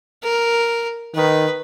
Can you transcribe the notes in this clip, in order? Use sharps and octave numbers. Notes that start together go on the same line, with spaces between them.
A#4
D#3 B4